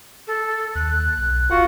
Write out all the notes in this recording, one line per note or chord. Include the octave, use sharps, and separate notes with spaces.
A4
D#2 F#6
B1
E1 F4 F#4 F#5